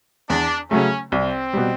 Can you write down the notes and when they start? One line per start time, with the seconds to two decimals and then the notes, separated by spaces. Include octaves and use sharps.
0.29 E2 D4
0.71 C#3 F#3 A3 C#4
1.12 C2 C4
1.53 B2 G3